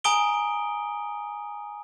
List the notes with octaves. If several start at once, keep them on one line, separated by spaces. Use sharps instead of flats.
G#5 A#5 D#6 D7 G7